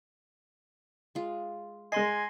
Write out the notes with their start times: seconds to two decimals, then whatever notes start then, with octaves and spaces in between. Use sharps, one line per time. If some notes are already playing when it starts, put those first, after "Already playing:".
1.15 G#3 F4
1.92 G#3 D#5 G#5 C6 A#6 C7